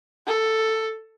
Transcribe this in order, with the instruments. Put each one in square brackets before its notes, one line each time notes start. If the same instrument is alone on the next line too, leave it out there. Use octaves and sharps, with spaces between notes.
[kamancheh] A4